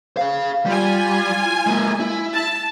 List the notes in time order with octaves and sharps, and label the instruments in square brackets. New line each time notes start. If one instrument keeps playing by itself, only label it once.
[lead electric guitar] G#4 F5
[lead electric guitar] G3 [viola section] F4 G#5
[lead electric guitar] G#3 A#3
E4
[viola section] A5